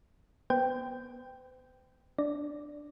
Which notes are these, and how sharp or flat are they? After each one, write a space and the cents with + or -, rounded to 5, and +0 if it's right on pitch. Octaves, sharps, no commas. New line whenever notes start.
B3 -25 C5 -45 G5 +0
D4 +0 D5 +0